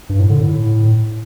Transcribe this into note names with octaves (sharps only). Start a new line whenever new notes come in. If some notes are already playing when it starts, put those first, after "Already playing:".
G2
A2
D3
A2